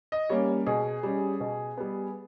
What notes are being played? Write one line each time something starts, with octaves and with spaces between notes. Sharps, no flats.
D#5
G3 A#3 C#4 C#5
B2 G#4
G3 C#4
B2
G3 B3